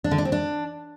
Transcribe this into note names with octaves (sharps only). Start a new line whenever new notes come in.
D4
D3
D4
C4
D4